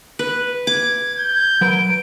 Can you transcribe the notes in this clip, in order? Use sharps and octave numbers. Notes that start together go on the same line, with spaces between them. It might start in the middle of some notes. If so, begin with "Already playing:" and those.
B4
D6 G#6
G6
F#3 A#4 B4 D7